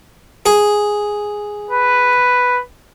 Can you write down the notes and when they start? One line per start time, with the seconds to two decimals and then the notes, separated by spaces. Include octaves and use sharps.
0.46 G#4
1.71 B4